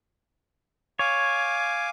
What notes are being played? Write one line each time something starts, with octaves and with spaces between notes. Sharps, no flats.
C#5 F5 G#5 D6